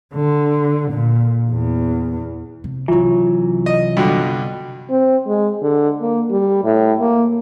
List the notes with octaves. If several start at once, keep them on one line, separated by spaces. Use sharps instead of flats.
D3
A#2
E2
C3
C2 C3 E3 F#3 F4
D#5
G2 B2 D3
C4
G#3
D3
A#3
G3
A2
A#3